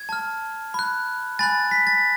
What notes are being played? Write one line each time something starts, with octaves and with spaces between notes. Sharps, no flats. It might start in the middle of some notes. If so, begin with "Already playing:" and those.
Already playing: G#6
A5 F6
B5 F#6
G#5 B5 F#6 A6
B6
A6